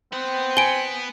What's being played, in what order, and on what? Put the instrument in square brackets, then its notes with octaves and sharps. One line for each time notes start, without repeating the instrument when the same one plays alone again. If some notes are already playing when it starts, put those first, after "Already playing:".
[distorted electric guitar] B3 F#5 [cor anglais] C4
[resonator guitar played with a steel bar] G#5 [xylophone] D7 G7